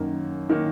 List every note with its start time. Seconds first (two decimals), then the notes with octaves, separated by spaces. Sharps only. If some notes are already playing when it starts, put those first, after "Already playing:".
Already playing: F#2 D#3 A#3
0.50 D#3 A#3